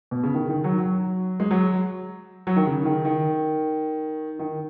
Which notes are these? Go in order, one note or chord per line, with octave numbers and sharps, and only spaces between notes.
B2
C#3
D#3
D#3
F#3
F#3
G#3
F#3
F#3
D#3
C#3
D#3
D#3
D#3